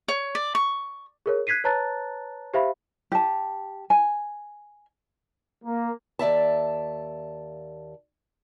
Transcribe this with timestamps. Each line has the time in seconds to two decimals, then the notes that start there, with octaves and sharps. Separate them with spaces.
0.08 C#5
0.35 D5
0.55 C#6
1.26 G#4 A#4 C#5
1.47 F#6 G#6 B6 C7 D#7
1.64 B4 C#5 A5 A#5 F#6 A6
2.54 G4 C5 E5 F5 B5
3.12 G4 A5
3.90 G#5
5.64 A#3
6.19 D#2 D5 E5 A5